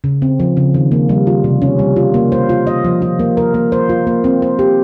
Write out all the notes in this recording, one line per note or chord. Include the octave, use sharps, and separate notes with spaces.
C#3
C4
F3
C#3
D#3
A#3
G3
F4
C3
C#4
G3
F4
A#3
C5
F4
D#5
F3
F4
A#3
A#4
A#3
C5
F4
A#3
C4
C5
G4